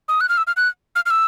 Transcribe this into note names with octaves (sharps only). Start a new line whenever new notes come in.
D#6
F#6
F6
E6
F6
F#6
F6
F6
E6